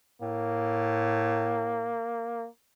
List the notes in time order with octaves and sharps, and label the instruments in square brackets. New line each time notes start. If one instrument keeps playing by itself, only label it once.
[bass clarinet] A2 [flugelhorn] A#3